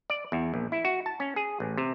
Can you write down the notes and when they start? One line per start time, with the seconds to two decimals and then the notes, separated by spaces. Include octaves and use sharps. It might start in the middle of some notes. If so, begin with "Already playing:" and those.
0.10 D5
0.32 E2
0.54 A#1
0.72 E4
0.85 F#4
1.06 A5
1.20 C#4
1.36 G#4
1.60 A1
1.77 C3